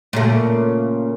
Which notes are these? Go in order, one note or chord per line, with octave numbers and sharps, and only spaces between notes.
A#2 C#3 A3